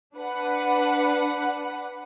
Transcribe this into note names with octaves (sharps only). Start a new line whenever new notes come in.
D4 B4 F#5